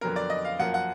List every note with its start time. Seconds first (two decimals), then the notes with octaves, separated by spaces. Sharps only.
0.01 F2 D3 F#3 B3 A#4
0.16 D5
0.30 D#5
0.45 F5
0.59 F#2 F3 A#3 F#5
0.74 F#5